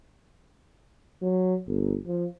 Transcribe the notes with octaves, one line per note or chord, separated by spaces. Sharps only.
F#3
G1
F3